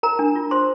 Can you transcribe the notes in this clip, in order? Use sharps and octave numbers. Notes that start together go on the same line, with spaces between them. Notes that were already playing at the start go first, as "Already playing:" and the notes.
A#4 A#5
D4
F4
C5 C6